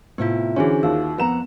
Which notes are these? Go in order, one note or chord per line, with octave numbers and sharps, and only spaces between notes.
A2 C3 B3 E4 F4
D3 E3 C#4 F#4 G#4 C5 C#5
D#2 F4 E6
F2 B3 F#5 A#5 E7